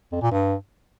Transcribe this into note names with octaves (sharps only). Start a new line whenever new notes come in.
F2
A#2
G2